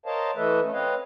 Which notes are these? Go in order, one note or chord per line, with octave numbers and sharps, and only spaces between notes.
A#4 C5 C#5 D#5 F5 A5
E3 A3 A4 B4 D#5 E5
A3 C#4
C4 B4 C#5 D#5 F5